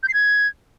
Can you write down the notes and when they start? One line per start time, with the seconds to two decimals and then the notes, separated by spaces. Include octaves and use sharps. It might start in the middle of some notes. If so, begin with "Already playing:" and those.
0.03 G6
0.08 C7
0.14 G#6